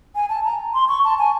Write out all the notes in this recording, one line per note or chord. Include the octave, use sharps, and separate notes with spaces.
G#5
A5
A#5
C6
C#6
A5
G#5